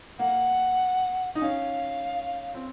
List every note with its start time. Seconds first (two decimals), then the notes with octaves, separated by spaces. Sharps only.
0.19 A#3 F#5
1.35 D#4
1.42 C#4 F5
2.55 C4